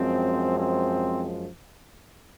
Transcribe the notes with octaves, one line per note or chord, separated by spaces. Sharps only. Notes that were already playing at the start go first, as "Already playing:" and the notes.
Already playing: F#2 F3 G#3 C4
C4